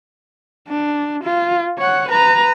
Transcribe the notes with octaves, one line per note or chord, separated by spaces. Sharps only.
D4
F4
C#5 F#5
B4 A#5